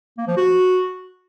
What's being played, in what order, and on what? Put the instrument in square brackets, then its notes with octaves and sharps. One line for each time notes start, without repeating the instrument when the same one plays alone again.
[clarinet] A#3
F3
F#4